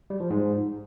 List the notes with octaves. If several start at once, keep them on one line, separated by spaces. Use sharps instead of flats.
G3
F3
G#2